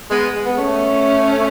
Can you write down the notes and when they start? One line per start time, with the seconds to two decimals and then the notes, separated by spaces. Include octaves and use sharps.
0.10 G#3 B3
0.46 B3
0.56 A3 C#4